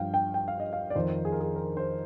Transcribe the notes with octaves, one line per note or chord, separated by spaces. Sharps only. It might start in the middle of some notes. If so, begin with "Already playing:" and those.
Already playing: G2 F3 F5 G5
G5
G5
F5
D#5
F5
D5
F2 D#3 C5
G#4
A#4
G#4
A#4
C5